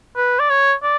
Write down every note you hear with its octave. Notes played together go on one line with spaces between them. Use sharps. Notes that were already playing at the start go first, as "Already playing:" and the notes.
B4
D5
C#5
D5